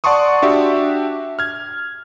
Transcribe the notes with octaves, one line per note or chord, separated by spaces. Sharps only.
D5 F#5 A5 C6 C#6 D#6
D4 F#4 G4 E5
F6 G#6